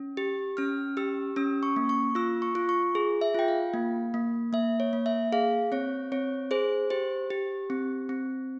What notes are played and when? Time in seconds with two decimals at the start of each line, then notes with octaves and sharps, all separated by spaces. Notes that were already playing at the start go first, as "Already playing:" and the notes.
Already playing: C#4
0.17 G4
0.57 C#4 F6
0.97 G4 E6
1.36 C#4 E6
1.63 C#6
1.76 A#3
1.89 C#6
2.15 F4 E6
2.42 C#6
2.55 F4
2.69 C#6
2.95 G#4
3.21 E5
3.35 F4 G5
3.48 F5
3.74 A#3
4.14 A#3
4.53 A#3 E5
4.80 C#5
4.93 A#3
5.06 E5
5.33 G#4 F5
5.72 C4 C#5
6.12 C4 C#5
6.51 G#4 C5
6.90 G4 C5
7.30 G4
7.70 C4
8.09 C4